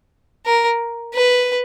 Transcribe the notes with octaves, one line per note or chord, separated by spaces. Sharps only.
A#4
B4